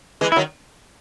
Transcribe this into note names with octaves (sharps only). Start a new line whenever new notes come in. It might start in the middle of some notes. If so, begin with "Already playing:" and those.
E3 G#3
E4
D#3 F#3